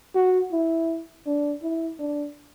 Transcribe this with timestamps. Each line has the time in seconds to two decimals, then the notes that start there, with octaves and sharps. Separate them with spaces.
0.15 F#4
0.52 E4
1.26 D4
1.62 E4
2.00 D4